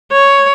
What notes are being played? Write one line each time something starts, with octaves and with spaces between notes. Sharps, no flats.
C#5